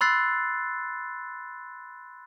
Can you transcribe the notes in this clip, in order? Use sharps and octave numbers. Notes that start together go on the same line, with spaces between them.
B5 C6 E6 F#6 A6 C7